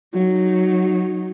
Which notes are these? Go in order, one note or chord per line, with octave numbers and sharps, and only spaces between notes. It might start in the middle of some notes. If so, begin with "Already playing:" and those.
F#3 D#4